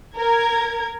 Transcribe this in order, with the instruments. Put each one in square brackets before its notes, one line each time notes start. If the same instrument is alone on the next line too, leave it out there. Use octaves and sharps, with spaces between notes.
[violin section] A#4 G#6